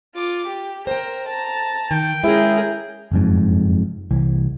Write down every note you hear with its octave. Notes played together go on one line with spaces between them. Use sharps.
F4 D6
G4
A#4 C5 G5
A5 A#5
D#3 G5
G#3 C#4 E4 G#4 A#4
F#1 F2 G#2
C2 E3